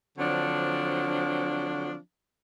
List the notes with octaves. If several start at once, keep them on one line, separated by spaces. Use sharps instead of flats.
D3 F3 F#3 C4 D4